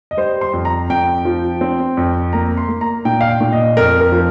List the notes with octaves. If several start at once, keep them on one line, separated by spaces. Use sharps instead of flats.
D#5
G3 C5
C6
F2
A#5
F2 G5
F3
C4
F2
A#3 A#5
C6
A#3
A#5
A#2 G5
F5
G5
A#2
D#5
F2 A#4
A#4
F3